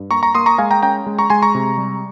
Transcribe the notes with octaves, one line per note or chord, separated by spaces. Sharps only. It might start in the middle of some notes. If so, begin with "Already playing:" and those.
Already playing: G2
A#3 A#5 C#6
A#5 C#6
A#3 C6 D#6
A#5 C#6
G#3 F5 G#5
G5 A#5
C#4 G5 A#5
G#3
A#5 C#6
G#3 G#5 C6
A#5 C#6
C3
G3